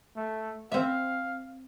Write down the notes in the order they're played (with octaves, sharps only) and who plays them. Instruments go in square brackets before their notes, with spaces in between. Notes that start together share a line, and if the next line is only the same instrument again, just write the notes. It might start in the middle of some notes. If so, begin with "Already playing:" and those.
[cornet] A3
[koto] C4 E5 [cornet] F5